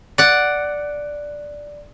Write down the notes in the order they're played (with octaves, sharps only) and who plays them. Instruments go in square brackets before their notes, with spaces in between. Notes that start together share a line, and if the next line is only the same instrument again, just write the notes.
[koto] D5 F#5